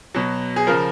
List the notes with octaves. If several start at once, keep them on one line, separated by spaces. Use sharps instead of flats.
B2 F#3
G#4
C#3 F3 A#4